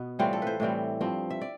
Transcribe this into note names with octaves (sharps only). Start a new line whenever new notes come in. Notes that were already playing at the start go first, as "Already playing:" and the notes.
Already playing: B2 B3
A2 E3 G3 C4 F4
A4
B4 C5
A2 E3 G3 C4
G2 F3 C4
E5
D5